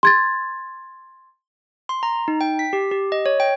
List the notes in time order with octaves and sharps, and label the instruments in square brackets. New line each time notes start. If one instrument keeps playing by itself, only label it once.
[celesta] C6 G#6 A6
[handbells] C6
A#5
D#4
G5
B6
G4
G4
D#5
C#5
G5